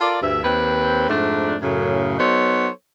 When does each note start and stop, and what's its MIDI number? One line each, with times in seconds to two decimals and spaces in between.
0.01 0.21 65
0.01 0.21 69
0.01 0.21 70
0.01 0.21 74
0.22 0.40 38
0.22 0.40 43
0.22 0.40 76
0.43 1.06 39
0.43 1.06 60
0.43 1.06 71
1.09 1.56 41
1.09 1.56 44
1.09 1.56 57
1.09 1.56 62
1.62 2.16 42
1.62 2.16 45
1.62 2.16 49
2.18 2.68 54
2.18 2.68 59
2.18 2.68 63
2.18 2.68 69
2.18 2.68 72
2.18 2.68 73